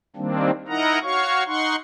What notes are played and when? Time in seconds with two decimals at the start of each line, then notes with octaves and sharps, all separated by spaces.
0.16 D#3 G3 A#3 C4 D4
0.68 D#4 E4 A#4 D#5 F#5 A#5
1.03 F#4 C#5 F5 C#6
1.47 D#4 F#5 C6 C#6